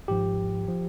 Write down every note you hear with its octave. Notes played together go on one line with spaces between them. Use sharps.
G#1 G#2 F3 G4
F3